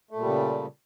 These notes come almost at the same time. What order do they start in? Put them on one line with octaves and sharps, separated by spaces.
A3 A#2 G3 C#3